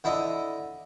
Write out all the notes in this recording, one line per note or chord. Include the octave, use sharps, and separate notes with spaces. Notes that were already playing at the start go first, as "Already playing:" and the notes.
D3 E4 D#5